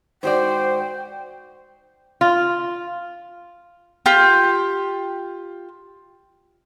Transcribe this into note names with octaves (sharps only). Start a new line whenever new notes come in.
G#2 F#4 C5 D5 G5
F4
F4 G4